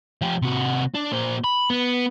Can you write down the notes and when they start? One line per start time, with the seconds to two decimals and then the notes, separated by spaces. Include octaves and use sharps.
0.22 F3 G4
0.42 C3 F#4
0.95 D4
1.12 A#2 C5
1.44 B5
1.70 B3